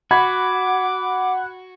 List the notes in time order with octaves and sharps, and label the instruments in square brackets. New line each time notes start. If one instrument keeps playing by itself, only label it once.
[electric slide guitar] F#4 [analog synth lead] F#5 [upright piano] B5 G#6 [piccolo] D6